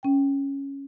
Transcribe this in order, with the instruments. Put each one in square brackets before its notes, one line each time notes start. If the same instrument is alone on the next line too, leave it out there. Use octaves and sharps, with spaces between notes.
[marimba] C#4 G5